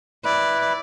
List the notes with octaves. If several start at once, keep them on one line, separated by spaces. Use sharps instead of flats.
E4 B4 D5